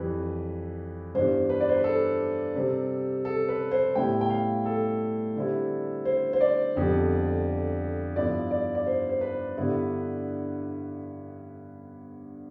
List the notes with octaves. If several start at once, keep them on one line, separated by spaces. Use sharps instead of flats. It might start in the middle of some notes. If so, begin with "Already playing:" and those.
Already playing: F2 E3 G3 B4
G2 E3 G3 B3 D4 C5
B4
D5
C5
B4
A4
C3 G3 C4
A4
B4
C5
A2 G3 B3 E4 G5
G5
F5
A4
D3 G3 C4 E4
C5
C5
D5
F2 D3 G3 B3
G2 F3 B3 E4 D5
D5
D5
C5
C5
B4
G2 D3 G3 B3 E4